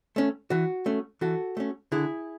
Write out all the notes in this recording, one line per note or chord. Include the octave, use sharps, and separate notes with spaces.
A3 C#4
E3 F#4
A3 C#4
E3 F#4 A4
A3 C#4
D3 E4 G#4